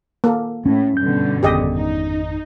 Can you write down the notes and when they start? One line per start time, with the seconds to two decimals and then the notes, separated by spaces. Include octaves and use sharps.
0.24 A#3 A4
0.66 A2 C#4
0.97 G2 B2 D3 G6
1.43 G#1 F2 G4 G#4 D#5
1.74 D#4